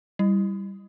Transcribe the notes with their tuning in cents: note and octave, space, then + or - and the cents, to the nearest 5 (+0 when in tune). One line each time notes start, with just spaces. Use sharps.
G3 +0 E4 +0